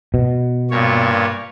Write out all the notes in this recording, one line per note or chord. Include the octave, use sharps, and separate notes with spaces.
B2
G2 A#2 C#5